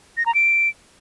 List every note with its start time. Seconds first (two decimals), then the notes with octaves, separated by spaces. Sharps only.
0.17 A#6
0.26 A#5
0.35 D7